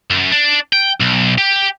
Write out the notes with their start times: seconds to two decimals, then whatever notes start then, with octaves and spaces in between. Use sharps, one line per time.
0.11 F#2
0.32 D4
0.73 G5
1.00 B1
1.38 G4